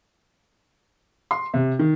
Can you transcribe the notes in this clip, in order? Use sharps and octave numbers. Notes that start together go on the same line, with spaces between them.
C6
C3
D#3